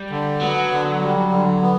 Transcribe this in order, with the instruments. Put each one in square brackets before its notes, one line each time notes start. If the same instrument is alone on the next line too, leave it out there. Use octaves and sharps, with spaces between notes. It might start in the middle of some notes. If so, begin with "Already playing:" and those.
Already playing: [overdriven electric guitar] G3
[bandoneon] D3
[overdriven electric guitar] F#3 [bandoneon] B3
[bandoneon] D3
G3
D3
B3